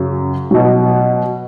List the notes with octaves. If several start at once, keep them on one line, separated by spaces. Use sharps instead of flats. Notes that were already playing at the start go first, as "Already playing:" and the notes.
Already playing: F#2 C#3 F#3
B2 F#3